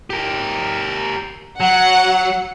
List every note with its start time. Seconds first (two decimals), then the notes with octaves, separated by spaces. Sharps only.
0.10 G4 A#4
1.60 F#3 F#5